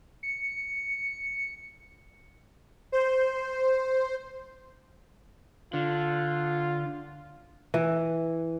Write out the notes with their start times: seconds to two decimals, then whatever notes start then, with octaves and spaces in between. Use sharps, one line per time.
0.23 C#7
2.92 C5
5.74 D3 F4
7.74 E3